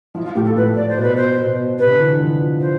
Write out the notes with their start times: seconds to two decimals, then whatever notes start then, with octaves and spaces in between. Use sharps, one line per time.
0.15 F3 E4
0.24 F4
0.35 A2 G4
0.45 A4
0.56 A2 B4
0.76 D5
0.89 C5
0.97 B2
1.02 B4
1.16 C5
1.37 B2
1.79 C3 B4
1.89 D3
1.99 E3
2.20 F3
2.60 C5